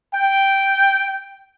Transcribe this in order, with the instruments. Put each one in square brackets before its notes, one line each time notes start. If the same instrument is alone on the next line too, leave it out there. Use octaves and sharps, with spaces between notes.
[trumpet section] G5